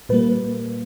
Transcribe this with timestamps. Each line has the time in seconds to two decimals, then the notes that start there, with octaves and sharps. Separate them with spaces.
0.09 A#2 G3 A#3 B4